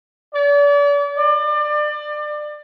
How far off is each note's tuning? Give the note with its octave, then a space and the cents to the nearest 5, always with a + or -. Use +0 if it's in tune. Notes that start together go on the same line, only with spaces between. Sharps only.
D5 -40
D5 +30